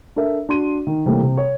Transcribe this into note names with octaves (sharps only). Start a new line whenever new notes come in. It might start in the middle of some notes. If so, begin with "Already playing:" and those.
D4 A4 A#4 E5
D4 F#4 C6 D#7
D#3
C3 E3 G3 A3 A#3 C4
C3
C#5